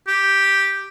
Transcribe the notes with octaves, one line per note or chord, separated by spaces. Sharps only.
G4